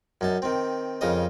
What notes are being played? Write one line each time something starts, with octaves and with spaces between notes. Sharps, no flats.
F#2 D#4 A5
D#3 C4
F2 C#3 D#4 A#4 D#5 D#6